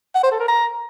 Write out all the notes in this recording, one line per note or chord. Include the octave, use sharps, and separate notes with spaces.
F#5
C5
A4
A#4
A#5